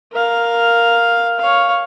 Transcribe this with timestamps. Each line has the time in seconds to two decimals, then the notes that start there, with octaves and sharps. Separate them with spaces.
0.13 A#4 F5
1.39 C#5 F5